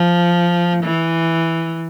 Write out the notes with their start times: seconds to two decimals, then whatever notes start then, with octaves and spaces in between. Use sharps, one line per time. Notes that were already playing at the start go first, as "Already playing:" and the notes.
Already playing: F3
0.83 E3